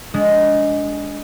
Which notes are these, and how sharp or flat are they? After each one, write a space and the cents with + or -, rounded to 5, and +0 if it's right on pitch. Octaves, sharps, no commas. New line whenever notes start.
G#3 +0 D4 -25